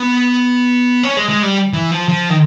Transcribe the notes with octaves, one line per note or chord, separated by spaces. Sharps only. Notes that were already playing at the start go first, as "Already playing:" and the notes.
Already playing: B3
C#4
G#3
G#3
G3
E3
F3
F3
D#3